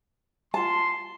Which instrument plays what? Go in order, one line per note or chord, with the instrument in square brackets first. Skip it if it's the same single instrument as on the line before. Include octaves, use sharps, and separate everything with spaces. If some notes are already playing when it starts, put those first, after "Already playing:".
[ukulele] F4 A5 [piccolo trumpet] C6